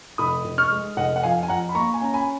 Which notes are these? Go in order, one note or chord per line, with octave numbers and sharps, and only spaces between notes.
F1 B5 D#6
F1
C#6 F6
G#3
F1 D#5 F#5
F#5
F2 F5 G#5
G#5
F2 F#5 A#5
B5
A#3 A#5 C#6
G#5
C#4 A#5
G#5 B5